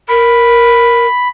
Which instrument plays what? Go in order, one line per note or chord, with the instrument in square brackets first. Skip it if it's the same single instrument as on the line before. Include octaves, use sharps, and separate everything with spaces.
[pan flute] A#4 [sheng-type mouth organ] B5